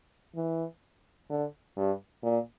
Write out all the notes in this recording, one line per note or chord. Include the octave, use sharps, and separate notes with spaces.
E3
D3
G2
A#2